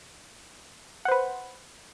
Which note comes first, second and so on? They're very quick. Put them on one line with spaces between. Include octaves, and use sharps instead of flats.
F#5 C5 B4